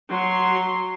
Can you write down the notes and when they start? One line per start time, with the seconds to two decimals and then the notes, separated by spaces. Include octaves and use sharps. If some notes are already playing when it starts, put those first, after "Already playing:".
0.10 F#3 C6